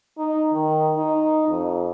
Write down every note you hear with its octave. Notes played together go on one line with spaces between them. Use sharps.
D#4
D#3
D#4
F2